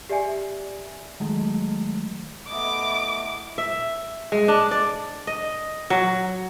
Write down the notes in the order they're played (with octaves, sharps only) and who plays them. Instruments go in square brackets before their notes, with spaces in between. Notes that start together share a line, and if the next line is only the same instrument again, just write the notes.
[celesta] G4 D5 E5 G#5
[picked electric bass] D#3 F#3 G#3 A3
[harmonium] A3 B3 D#5 [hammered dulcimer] E4 [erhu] D6
[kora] E5
G#3
D4
D5
D#5
F#3